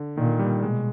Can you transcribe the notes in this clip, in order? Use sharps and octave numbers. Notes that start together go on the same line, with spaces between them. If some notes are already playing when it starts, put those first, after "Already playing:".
Already playing: D3
A#2 D#3
G3
B2 G#3